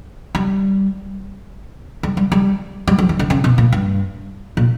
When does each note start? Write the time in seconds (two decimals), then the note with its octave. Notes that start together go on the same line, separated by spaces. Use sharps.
0.35 G3
2.03 G3
2.17 G3
2.32 G3
2.88 G3
2.98 F#3
3.09 E3
3.19 D3
3.30 C#3
3.44 B2
3.58 A#2
3.72 G2
4.57 A#2